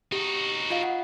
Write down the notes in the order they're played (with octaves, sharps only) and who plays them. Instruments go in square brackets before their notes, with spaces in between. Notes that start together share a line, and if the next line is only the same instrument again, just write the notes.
[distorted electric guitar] D#4 F#4 [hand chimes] G4
[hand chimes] F4 D#5 F5
F#5